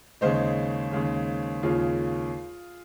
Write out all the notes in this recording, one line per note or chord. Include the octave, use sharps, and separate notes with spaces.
D#2 C#3 G#3 C5 D#5
D#2 C#3 G#3
D#2 C#3 G#3 F4 G#4